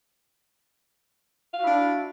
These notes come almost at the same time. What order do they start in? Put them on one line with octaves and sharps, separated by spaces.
F5 F#4 E4 D4